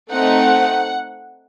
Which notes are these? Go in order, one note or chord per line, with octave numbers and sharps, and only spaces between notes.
A3 C4 D#4 F#5